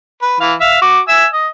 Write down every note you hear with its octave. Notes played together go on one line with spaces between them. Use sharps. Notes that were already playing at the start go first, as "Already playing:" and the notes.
B4
E3 F5
E5 F5
F#4 D6
E5 G#5 E6
D#5